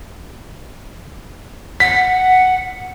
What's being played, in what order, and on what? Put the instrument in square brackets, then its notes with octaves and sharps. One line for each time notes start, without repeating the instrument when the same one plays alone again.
[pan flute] F#5 [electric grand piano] B6